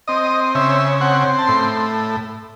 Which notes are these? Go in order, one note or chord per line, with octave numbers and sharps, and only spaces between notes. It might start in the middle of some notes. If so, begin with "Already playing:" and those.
C4 D#5
C#3 E5
C4 F#5
A5
A2 C6